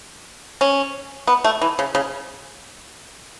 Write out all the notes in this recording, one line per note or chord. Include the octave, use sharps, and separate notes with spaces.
C#4
B3
A3
E3
C#3
C#3